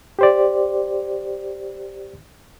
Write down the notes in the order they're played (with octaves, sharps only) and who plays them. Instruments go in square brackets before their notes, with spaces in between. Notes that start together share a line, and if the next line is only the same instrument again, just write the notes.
[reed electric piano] G4 C5 D5